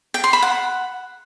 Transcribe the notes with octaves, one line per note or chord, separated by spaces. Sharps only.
G5
C6
B5
F#5